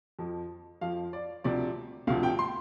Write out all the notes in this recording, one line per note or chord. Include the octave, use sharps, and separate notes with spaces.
F2 F3
F2 F3 F5
D5
D2 C3 F3 D5
D2 C3 F3 F5
G5
C6